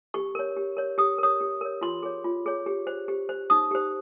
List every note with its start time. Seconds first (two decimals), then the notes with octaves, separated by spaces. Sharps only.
0.14 G4 C#6
0.35 A#4 C#5
0.56 G4
0.77 A#4 C#5
0.98 G4 D#6
1.18 A#4 C#5 D#6
1.41 G4
1.61 A#4 C#5
1.81 F4 C6
2.03 G#4 C#5
2.24 F4
2.46 G#4 C#5
2.66 G4
2.87 C5
3.08 G4
3.29 C5
3.50 D#4 D#6
3.71 G4 C5